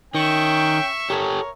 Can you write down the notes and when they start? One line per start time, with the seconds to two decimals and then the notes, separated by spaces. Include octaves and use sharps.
0.15 D#3 C#4 E5 G5 C#6
1.10 G4 A4 A#4 C#5